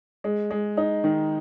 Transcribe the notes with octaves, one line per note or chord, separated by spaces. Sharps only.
G#3
G#3
D#4
D#3